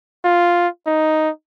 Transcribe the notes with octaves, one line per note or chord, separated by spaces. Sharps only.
F4
D#4